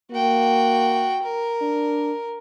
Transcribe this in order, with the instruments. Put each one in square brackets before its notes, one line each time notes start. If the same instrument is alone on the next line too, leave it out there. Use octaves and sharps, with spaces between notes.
[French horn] A#3 [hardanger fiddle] F#4 G5
[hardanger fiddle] A#4
[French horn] D4